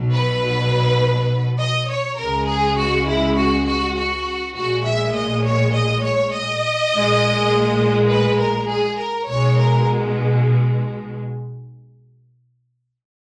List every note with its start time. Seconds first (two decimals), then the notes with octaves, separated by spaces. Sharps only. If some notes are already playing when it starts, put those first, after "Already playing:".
Already playing: B1 B2 F#3
0.13 B4
1.60 D#5
1.90 C#5
2.19 C#2 C#3 G#3 A#4
2.48 G#4
2.78 F#4
3.08 E4
3.37 F#4
3.67 F#4
3.97 F#4
4.56 A#1 A#2 G#3 F#4
4.85 E5
5.15 D#5
5.45 C#5
5.75 D#5
6.03 C#5
6.33 D#5
6.92 A#1 A#2 G#3
8.11 B4
8.40 A#4
8.70 G#4
9.00 A#4
9.29 B1 B2 G#3 C#5
9.59 A#4